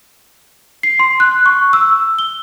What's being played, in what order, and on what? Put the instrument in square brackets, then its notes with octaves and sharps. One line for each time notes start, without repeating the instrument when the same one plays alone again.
[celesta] C7
C6
F#6
C#6
E6
G7